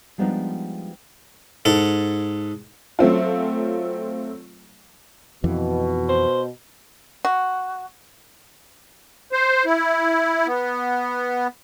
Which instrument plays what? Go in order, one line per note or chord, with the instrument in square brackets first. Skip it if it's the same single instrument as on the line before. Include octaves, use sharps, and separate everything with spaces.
[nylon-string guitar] F3 G3 G#3 B3 D4 D#4
[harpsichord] G#2 A4
[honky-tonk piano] F#3 A3 C4 F4
[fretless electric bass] F2 E3 [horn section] B2
[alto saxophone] C5
[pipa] F#4
[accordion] C5
E4
B3